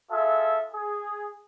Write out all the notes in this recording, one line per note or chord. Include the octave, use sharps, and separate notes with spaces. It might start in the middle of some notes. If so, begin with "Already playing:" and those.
F4 G#4 A4 E5
G#4